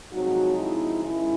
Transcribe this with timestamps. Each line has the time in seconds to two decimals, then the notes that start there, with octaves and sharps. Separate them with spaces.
0.12 C3 F3 F#3 G#3 C4 D#4 F#4
0.58 E4
1.03 G#2 D#3 G#3 C#4 E4